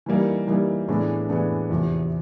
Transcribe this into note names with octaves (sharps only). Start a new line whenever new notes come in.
E3 G3 A#3 D#4
E3 G3 A#3 D#4
A2 E3 G#3 B3 D4
A2 E3 G#3 B3 D4
E2 C3 F3